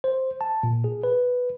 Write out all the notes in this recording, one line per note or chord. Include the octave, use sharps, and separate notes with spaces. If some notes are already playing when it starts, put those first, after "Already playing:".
C5
A5
A#2
G#4
B4